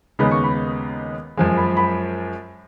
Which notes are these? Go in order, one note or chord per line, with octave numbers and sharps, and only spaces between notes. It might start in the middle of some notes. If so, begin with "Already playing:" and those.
D#2 C#3 G#3 B3 D#4 B5
C#6
B5
F#2 F3 G#3 G#5
B5
B5